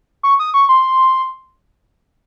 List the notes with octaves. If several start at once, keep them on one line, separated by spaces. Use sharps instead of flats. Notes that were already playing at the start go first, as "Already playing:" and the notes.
C#6
D#6
C#6
C6